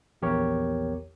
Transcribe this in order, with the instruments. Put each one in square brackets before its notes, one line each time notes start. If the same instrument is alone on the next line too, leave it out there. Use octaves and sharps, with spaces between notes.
[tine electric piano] A#1 E2 G4 A#4 C#5 C#6